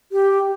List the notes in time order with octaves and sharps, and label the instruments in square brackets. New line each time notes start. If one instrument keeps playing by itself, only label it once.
[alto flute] G4